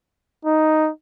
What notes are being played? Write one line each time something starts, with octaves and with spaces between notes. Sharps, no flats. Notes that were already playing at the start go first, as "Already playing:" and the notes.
D#4